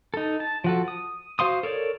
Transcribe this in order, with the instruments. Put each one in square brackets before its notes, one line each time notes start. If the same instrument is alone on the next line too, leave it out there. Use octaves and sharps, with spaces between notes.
[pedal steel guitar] D#4 A4
A5
F3 F#4 A4
D#6
F#4 C5 F5 C6 D#6
A4 A#4 C#5 D5